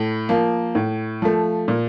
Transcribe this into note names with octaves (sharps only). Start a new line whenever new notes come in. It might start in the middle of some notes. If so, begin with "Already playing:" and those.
Already playing: A2
F3 A#3
A2
F3 A3
A#2